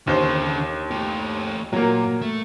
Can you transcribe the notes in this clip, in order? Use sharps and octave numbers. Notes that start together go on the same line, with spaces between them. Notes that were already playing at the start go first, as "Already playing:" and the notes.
D#2 D3 C#4 C5
A3 G4
A#2 F#3 A#3
A3